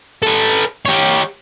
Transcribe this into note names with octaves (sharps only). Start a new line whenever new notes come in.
A4 B4
G4 C#5